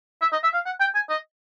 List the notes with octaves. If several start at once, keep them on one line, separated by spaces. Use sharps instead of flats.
E5
D#5
E5
F5
F#5
G5
G#5
D#5